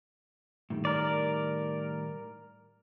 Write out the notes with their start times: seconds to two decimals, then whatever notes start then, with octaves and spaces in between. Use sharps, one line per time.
0.70 A2 D#3 G3
0.85 A#4 D5